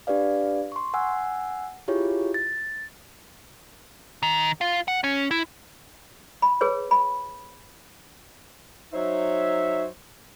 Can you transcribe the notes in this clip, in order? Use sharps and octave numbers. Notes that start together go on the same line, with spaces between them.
D4 G4 B4 D5 F5
C6 C#6
F#5 G#5 E6
E4 F4 G4 G#4 C#5
A6
D#3
F4
F#5
C#4
E4
B5
G#4 B4 C#5
B5
F#3 D#4 C5 C#5 E5